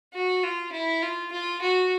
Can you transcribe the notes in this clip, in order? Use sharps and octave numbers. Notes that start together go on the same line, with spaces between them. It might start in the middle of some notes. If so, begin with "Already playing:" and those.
F#4
F4
E4
F4
F4
F#4